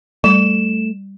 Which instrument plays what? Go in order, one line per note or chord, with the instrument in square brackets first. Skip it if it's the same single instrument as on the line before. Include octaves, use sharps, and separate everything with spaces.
[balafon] G3 [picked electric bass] A3 [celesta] E7